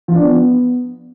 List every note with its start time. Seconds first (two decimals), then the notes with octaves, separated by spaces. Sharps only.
0.08 F3
0.15 D4
0.22 B3